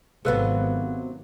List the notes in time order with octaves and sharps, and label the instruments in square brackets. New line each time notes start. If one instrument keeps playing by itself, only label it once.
[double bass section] G#1 [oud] C3 F#3 B3 [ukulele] A4 B4 F5